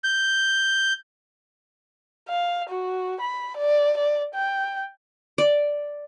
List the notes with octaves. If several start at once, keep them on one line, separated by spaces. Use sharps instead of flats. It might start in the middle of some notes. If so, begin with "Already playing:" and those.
G6
F5
F#4
B5
D5
D5
G5
D5